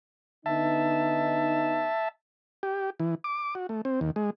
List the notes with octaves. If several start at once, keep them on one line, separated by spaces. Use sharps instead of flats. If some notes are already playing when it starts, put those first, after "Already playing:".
D3 B3 D#4 E5 A5
G4
E3
D6
F#4
A3
C4
D#2
G#3